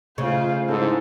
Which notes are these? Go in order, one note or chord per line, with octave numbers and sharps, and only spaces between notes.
C#3 A3 F4 C5 C#6
G#2 C#4 E4 A4